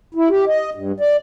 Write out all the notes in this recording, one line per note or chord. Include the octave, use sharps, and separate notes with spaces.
E4
G4
D#5
G2
D5